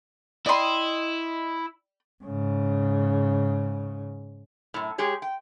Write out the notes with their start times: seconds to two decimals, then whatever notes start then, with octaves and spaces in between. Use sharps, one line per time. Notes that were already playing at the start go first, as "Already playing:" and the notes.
0.46 E4 D5 D#5 G5 B5 C6
2.24 G#2 C#3
4.74 F#2 A2
4.98 G#3 G4 G#4 C#5
5.22 G5